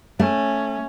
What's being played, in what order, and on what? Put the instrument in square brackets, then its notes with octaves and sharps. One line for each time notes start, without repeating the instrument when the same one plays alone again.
[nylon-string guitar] A3 [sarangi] C#4